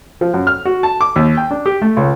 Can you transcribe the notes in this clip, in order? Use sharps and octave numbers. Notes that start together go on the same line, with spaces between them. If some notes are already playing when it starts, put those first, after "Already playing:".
F3
F#2
F6
F#4
A5
D6
D#2
G5
D4
G4
A3
C#2